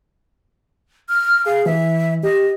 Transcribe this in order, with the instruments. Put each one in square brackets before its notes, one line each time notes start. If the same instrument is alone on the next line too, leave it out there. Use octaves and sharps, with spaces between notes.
[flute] F6
[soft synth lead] G#4 [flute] F5
[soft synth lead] E3 [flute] E5
[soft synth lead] G4 [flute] D#5